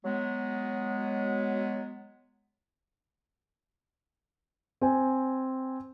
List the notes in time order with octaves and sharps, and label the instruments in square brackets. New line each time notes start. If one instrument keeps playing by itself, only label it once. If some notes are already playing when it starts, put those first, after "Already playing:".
[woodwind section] F#3 G#3 B3
[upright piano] C4 G#5